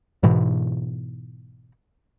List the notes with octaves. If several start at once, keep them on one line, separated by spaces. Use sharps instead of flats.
G#2 B2 E3